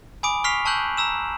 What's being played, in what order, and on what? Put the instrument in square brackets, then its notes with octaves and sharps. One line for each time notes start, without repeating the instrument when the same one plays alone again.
[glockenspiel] G#5 B5 D6 D#6 D7
C#6 F6 B6 C7 F7
A5 C#6 E6 F#6 G6 F#7
A#5 E6 E7